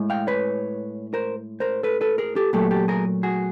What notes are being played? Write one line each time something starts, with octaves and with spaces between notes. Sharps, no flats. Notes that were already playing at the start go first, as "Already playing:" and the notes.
Already playing: A2 G#3
F5 G5
B4 C#5
A#4 C5
A#4 C5
A4 B4
A4 B4
G#4 A#4
G4 A4
A#2 F#3 A3 G4 A4
G4 A4
G#4 A#4
F#4 G#4